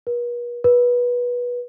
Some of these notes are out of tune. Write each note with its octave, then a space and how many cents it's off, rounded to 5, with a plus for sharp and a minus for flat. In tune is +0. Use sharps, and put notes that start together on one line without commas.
B4 -45
B4 -20